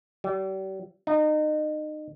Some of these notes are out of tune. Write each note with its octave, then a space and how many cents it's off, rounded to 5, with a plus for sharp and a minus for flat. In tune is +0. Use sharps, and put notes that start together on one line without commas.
G3 -40
D#4 -30